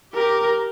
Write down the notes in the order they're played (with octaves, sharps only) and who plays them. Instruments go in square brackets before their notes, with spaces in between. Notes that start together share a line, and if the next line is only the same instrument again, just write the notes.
[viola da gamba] G4 [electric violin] A#4